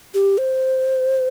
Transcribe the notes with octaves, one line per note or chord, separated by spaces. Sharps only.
G4
C5